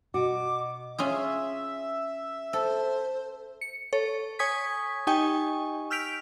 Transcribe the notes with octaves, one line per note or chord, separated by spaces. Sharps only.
B2 F#4 D6
C#4 F4 G#4 E5
A4 C5
C#7
A4 C#5
C#5 G#5 C#6 D#6 G#6 B6
D#4 G4 D#5 G5 G#5 C#6
E6 F6 G6 B6 D7 F7